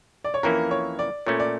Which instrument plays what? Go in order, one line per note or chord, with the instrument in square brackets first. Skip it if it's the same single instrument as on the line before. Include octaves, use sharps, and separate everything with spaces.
[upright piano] D5
C#5
[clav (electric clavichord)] F2 E3 A#3 C#4 E4 [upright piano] A#4
[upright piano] C#5
D5
[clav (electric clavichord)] A#2 A3 C#4 [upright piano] C#5
[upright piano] D5